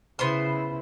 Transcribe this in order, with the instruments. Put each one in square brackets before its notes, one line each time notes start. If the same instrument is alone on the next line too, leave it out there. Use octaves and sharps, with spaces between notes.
[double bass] C#3 E4 [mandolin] B3 C5 C6